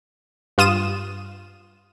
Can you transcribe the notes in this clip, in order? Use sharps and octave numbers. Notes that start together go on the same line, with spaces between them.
G2 F4 D#6 D#7 E7